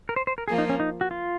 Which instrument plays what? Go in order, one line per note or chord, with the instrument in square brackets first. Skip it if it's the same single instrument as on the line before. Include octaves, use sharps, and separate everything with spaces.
[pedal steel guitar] A#4
C5
C5
A#4
[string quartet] F3 A#3 F4 [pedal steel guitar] G#4
[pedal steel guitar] D#4
C#4
D#4
F#4
F4